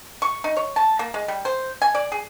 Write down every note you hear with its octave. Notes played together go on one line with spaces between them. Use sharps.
C#6
D#4
C#5
A5
A#3
G#3
G3
C5
G#5
D5
G#4